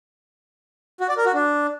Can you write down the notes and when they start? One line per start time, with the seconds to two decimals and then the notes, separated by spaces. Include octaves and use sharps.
1.00 F#4
1.09 D5
1.17 A#4
1.26 F#4
1.34 D4